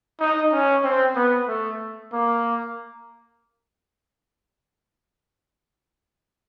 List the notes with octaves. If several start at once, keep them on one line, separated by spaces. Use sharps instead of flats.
D#4
C#4
C4
B3
A3
A#3